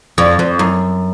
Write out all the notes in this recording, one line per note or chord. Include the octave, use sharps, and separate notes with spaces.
F2
F2
F#2